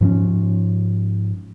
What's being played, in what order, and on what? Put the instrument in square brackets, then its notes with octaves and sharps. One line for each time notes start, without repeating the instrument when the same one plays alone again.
[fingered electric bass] G#2 F3 C4 C#4